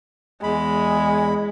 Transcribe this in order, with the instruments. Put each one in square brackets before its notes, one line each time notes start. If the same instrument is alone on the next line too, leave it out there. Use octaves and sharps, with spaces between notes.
[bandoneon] E2 B5 [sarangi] G#3